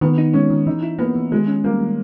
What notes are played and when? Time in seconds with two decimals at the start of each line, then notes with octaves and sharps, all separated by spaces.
0.01 D#3 B3
0.18 D#4
0.33 G#3 C#4
0.50 D#3
0.67 E3 D#4
0.83 E4
0.98 A#3 B3
1.16 E3
1.31 D#3 G#3
1.47 C#4
1.64 G3 A#3
1.81 D#3